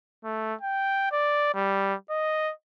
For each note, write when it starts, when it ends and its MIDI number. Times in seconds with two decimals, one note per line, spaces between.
0.25 0.54 57
0.61 1.09 79
1.12 1.53 74
1.55 1.95 55
2.10 2.52 75